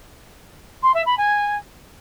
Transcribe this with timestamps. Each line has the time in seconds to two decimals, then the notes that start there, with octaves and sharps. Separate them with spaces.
0.82 C6
0.94 E5
1.06 B5
1.17 G#5